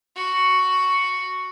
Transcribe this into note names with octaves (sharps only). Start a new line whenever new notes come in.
F#4